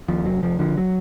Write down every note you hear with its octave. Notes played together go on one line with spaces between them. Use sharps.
D#2 F3
F1 F#3
F1 F3
D3 F3
F#3